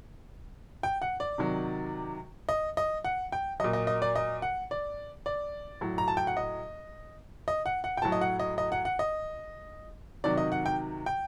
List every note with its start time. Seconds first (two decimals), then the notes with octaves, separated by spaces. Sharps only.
0.83 G5
1.02 F#5
1.20 D5
1.38 C3 D#3 F#3
2.49 D#5
2.77 D#5
3.05 F#5
3.32 G5
3.60 A#2 F#3 D#5
3.73 D#5
3.87 D#5
4.02 D5
4.15 D#5
4.42 F#5
4.71 D5
5.26 D5
5.81 A2 F#3
5.98 A#5
6.08 A5
6.17 G5
6.27 F#5
6.37 D#5
7.48 D#5
7.66 F#5
7.84 F#5
7.97 G5
8.02 A2 F#3 A5
8.12 D#5
8.21 F#5
8.40 D#5
8.58 D#5
8.72 F#5
8.85 F#5
8.99 D#5
10.24 C3 D#3 F#3 D5
10.38 D#5
10.52 F#5
10.66 G5
11.06 G5